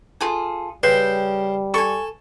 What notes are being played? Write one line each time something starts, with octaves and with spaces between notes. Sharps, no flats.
F4 G#4 A4
C#3 G3 B4 G5 C6
A4 G#5 C#6